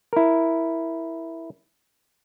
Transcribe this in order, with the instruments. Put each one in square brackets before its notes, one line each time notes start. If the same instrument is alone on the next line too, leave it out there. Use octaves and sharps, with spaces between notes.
[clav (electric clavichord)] E4 A#4